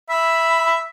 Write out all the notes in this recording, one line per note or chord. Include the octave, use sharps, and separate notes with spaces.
E5 B5